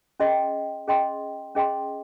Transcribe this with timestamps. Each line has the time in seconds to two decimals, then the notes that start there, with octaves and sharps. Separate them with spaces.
0.20 C#4 G#4 D#5 G5 C6
0.88 C#4 G#4 D#5 G5 C6
1.55 C#4 G#4 D#5 G5 C6